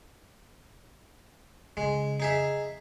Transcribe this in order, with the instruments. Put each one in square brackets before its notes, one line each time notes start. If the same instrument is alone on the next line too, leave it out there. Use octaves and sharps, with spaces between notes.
[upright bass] C#3 [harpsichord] G#3
[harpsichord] D#4 G#4 E5